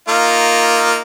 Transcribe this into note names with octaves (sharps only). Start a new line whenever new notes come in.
A#3 D#4 F4